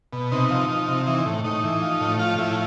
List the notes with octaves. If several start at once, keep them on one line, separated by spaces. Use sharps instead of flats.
B2
C3 D#4
F3
F3
C3
E3 D#4
A2
A2 D#4
E3
F3
A2
F3 F4
A2 E4